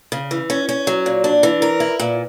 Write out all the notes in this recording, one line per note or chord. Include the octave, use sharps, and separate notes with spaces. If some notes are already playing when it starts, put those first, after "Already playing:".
C#3
E3
C#4
C#4
F#3
A#2
D4
E3
A#4
E4
A#2